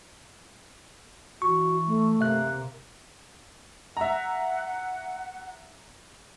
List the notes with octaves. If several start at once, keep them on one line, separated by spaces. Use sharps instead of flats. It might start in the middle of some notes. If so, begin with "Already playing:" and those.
E3 F#4 C#6
A3
C3 A#3 E5 F#6
E5 F#5 A#5